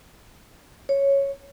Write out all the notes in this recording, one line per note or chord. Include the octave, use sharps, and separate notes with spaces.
C#5